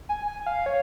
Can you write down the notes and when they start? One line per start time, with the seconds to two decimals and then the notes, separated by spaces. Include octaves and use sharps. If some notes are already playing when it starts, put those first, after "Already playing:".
0.09 G#5
0.27 G#5
0.47 F5
0.66 C#5